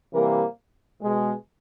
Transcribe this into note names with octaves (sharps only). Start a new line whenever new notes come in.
C3 E3 G3 A#3 A#4
B2 G#3